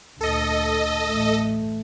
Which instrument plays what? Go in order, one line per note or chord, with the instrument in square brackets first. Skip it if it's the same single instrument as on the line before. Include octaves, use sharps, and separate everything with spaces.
[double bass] D2 A#2 [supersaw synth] A4 D#5
[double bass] A1 A3